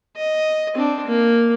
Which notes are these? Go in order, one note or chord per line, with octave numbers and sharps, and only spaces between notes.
D#5
C4 D4
A#3